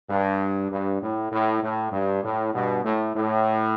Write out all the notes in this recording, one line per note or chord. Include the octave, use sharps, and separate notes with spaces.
G2
G2
A2
A2
A2
G2
A2
G2 B2
A2
A2